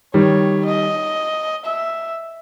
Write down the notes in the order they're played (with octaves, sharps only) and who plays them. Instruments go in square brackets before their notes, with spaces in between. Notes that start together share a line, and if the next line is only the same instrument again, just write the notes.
[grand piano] D#3 G3 [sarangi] C#5
[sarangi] D#5
E5